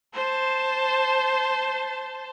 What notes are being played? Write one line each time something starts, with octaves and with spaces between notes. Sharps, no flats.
C5 A5